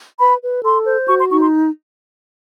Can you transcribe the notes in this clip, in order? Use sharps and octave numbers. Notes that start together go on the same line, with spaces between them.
B4 B5
B4
A4 C6
C5
F#4 C#6
C6
D#4 C#6
C6